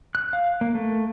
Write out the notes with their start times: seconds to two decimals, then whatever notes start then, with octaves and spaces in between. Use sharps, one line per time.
0.15 F#6
0.33 F5
0.61 A#3
0.75 A3